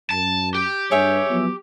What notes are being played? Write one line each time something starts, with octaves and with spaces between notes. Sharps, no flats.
F#2 A5
G4
G2 G#4 C#5 E5
F3 F#3 B3